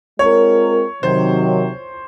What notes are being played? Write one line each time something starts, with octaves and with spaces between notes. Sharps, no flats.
G#3 C4 F4 A#4 C#5
C3 D#3 F#3 C5